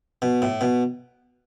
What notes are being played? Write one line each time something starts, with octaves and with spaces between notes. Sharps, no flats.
B2
A2
B2